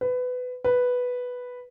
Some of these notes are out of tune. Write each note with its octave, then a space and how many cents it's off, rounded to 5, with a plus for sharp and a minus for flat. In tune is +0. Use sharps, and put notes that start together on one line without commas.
B4 +20
B4 +0